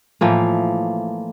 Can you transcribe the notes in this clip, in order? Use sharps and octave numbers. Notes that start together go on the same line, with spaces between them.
A2 E3 F3 A#3